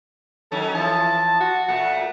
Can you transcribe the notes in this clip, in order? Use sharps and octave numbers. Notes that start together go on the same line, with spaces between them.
D#3 F#3 C#4 A4
E3 F3 A4 A5
F#4
A#2 A3 F#5